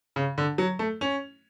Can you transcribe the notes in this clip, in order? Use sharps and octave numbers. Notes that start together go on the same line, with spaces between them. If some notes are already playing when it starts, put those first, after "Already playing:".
C#3
D3
F#3
A3
C#4